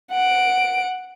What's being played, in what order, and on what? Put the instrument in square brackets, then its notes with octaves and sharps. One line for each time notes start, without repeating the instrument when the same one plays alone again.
[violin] F#5 D7